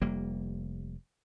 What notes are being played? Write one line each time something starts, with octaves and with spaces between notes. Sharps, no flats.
F1 G3 A#3